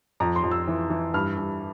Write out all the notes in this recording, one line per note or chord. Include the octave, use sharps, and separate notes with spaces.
F2 A#5
C6
F2
E6
E3
E3
G2 F6
G2